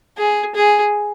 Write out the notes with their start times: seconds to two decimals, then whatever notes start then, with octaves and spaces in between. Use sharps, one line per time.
0.18 G#4
0.55 G#4